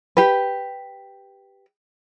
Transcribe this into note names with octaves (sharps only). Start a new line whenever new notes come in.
G4 B4